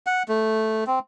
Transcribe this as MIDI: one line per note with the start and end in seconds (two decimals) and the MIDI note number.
0.07 0.23 78
0.28 0.84 57
0.87 0.99 60